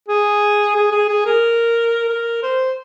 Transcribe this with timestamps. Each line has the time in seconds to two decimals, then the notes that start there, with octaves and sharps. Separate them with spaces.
0.09 G#4
0.76 G#4
0.92 G#4
1.09 G#4
1.26 A#4
2.09 A#4
2.43 C5